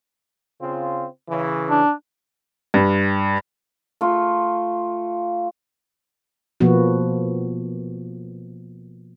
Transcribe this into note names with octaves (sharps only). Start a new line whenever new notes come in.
C#3 C4 F4
C#3 E3
D4
G2
A3 F4
B2 F3 A#3 B3 F#4